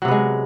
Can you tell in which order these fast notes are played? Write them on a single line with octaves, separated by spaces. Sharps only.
F#3 C3 B3 G#3